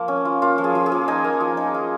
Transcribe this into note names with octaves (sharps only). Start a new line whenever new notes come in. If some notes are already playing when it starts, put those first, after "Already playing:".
Already playing: F3 A#3
C#4
F4
A#3 F4
F3
G#4
F3
G#4
A#3
D#4 G#5
A#3
F3
D#4
F4